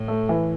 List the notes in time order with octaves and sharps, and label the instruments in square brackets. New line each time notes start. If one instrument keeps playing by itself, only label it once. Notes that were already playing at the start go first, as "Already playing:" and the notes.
Already playing: [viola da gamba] A2
[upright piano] A3
E3